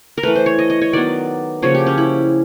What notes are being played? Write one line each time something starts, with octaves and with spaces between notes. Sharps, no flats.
A#4
E3 A3 B4
C5
C#5
D#5
D#5
C#5
D#3 F#3 B3 D5
C#3 F3 A#3 C#5
G4
C#4
E4